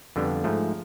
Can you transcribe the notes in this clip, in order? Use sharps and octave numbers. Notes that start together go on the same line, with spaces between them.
F2 D3 G3 B3
G#2 F3 A3